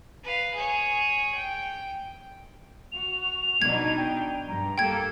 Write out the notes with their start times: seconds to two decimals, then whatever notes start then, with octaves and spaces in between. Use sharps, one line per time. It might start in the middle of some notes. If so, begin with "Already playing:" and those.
0.24 B4 F5
0.54 G#4 C#5
1.35 G5
2.92 F#4 F7
3.22 F7
3.62 B2 D4 D#4 G#6
3.97 G5
4.48 G2 A#5
4.78 A#3 G4 A4 G5 G#6